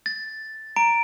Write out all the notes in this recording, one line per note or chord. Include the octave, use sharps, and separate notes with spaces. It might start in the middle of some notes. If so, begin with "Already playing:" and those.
A6
A#5 D7